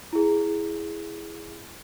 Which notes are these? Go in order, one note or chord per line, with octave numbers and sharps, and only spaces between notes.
E4 G#4